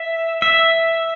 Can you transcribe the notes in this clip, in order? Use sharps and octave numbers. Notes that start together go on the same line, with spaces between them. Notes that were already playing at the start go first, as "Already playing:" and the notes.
Already playing: E5
E5